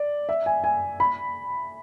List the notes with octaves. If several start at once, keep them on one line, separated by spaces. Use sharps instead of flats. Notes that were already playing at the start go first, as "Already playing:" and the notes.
Already playing: D5
E5
G#5
G#5
B5